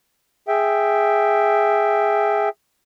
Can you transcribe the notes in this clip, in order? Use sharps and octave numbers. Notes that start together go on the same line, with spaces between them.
G#4 E5 G5